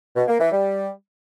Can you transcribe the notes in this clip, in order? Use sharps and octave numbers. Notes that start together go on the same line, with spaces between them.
B2
A#3
E3
G3